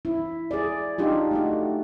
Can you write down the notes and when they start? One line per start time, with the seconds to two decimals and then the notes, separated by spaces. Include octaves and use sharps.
0.05 E4
0.51 G#4 D5
0.98 D4 D#4 F4 G4
1.31 A3 D#4 F#4